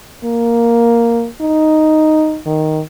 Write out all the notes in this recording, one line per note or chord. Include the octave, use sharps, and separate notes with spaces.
A#3
D#4
D#3